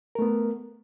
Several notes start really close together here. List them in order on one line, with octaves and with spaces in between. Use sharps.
A#4 A3 B3